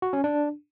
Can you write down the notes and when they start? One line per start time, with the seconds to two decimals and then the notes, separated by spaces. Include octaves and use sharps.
0.02 F#4
0.13 C#4
0.24 D4